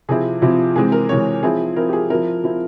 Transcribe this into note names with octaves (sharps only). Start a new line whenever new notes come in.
C3 F3 C4 E4 G#4
C3 F3 C4 E4
C3 E3 G#3 C4 G#4
A#4
C3 E3 G#3 C4 C#5
F3 C4 E4 G#4
F3 C4 E4 A#4
G4
G#4
F3 C4 E4 A#4
F3 C4 E4